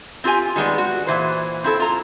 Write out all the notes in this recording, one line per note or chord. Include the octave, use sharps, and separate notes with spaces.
C4 F4 G4 G#5
D#3 G3 G#3 B3 D5
F#4
A#2 E3 C5
C4 E4 A4
F4 A#5